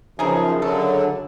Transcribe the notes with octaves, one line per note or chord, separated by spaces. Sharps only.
F#2 C#3 E3 F3 D#4 G#4
D3 F#3 A4